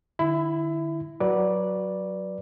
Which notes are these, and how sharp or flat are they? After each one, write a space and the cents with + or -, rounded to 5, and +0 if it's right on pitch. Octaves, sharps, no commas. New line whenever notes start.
D3 +45 E4 +0 B5 +30
F#3 +5 B4 -20 D5 +0